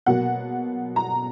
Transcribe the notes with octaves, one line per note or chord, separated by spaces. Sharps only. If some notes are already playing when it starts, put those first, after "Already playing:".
B2 F#3 A#3 F#5
A#5